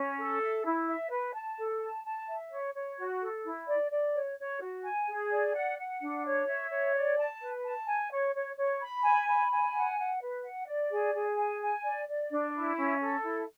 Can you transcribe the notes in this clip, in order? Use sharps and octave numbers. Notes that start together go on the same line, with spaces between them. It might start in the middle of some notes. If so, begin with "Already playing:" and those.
Already playing: C#4
A4
E5
E4
E5
B4
A5
A4
A5
A5
E5
C#5
C#5
F#4
A4
E4
D5
D5
C#5
C#5
F#4
G#5
G#4
D5
F#5
F#5
D4
C#5
E5
C#5
D5
A5
B4
A5
G#5
C#5
C#5
C#5
B5
G#5
B5
G#5
F#5
F#5
B4
F#5
D5
G#4
G#4
G#5
G#5
D5
D5
D4
E4
C#4
A4
E4